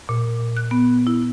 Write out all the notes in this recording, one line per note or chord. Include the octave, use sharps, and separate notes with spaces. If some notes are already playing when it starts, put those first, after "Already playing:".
A#2
F#6
B3
E4